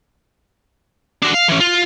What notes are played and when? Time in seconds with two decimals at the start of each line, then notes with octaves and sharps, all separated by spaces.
1.23 D4 F#4
1.34 F5
1.49 E3 C#4
1.60 F4